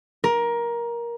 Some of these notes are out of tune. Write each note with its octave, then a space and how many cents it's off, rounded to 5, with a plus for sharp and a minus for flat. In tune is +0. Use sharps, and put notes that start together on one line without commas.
A#4 +15